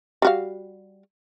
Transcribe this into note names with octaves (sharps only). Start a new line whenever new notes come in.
G3 F#4 F5